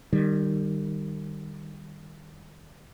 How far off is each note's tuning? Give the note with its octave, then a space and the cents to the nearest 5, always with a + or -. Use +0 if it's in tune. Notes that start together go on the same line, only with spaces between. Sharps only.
D#3 -30 G3 +0